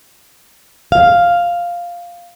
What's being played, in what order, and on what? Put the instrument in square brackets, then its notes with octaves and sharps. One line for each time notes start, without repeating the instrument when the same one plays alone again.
[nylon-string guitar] F5